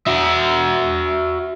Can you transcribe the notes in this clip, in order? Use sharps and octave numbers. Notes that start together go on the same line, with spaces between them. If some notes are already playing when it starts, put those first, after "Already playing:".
F#4 E5